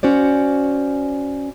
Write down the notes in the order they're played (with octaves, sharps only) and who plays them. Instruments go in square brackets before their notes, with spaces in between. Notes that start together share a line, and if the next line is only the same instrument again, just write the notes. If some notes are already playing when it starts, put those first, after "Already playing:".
[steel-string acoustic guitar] C#4 F#4 C5 D5